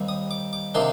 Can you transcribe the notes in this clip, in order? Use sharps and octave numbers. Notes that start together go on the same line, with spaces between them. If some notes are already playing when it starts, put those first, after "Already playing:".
Already playing: D#2 D#3 G3 C4
D#6
D6
D6
C3 D#3 A#3 D4 C6